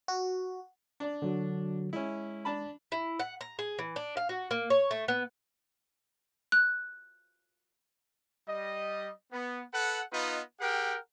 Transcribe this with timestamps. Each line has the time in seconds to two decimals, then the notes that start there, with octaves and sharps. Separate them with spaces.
0.08 F#4
1.00 D4 D5
1.22 D3 F#3 F#4
1.93 G#3 C#4 E4
2.45 D4 A5 B5
2.92 E4
3.19 F#5
3.41 A#5
3.59 G#4
3.79 E3
3.96 D4
4.17 F5
4.29 F#4
4.51 A#3
4.70 C#5
4.91 A3
5.08 B3
6.52 F#6
8.48 G3 D#5
9.32 B3
9.74 A4 B4 F#5
10.12 B3 D#4 F4 B4 D#5
10.60 G4 G#4 A#4 F#5 G5